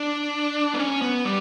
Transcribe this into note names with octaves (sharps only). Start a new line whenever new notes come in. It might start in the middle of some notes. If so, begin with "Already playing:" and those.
Already playing: D4
B3
C#4
B3
G3